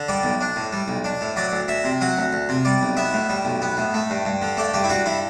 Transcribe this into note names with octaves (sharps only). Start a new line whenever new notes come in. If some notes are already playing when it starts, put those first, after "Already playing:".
Already playing: D3
G3 D5
B1
D4
A2
G3
B1
D4
A2
F#3 D5
D2
D2 E5
C3
F#3 F#5
D2
D2
C3
G3 D5
B1
B3 E5
A2
G3
B1
B3
A2
A3
G2
G2
D3
A3 D5
G2 G4
E4
G2 F#4
D3 E4